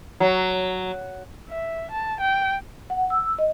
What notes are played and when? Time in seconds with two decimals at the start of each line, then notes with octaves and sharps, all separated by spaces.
0.20 F#3
1.50 E5
1.91 A5
2.21 G5
2.90 F#5
3.10 E6
3.39 D#5